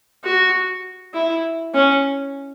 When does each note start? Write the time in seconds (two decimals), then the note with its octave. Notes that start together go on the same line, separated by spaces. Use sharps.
0.24 F#4
1.14 E4
1.74 C#4